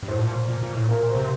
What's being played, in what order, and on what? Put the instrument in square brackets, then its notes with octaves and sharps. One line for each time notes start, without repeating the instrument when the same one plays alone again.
[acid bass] G2
[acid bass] A2 [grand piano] C5
[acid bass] A#2
A#2
A#2
A2
[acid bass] A#2 [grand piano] A#4
[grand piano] C5
[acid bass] C3